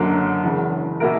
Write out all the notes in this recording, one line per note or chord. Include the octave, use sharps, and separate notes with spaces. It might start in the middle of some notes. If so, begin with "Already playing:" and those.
Already playing: F#1 F#2 D3 F#3 A#3
E1 E2 C#3 E3
B2 A#3 E4 A#4